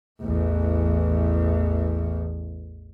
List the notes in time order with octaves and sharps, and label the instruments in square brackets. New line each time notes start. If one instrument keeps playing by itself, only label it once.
[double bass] A1 E2